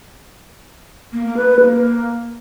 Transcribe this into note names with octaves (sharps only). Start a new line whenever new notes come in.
A#3
A#3
B4
B4
A#3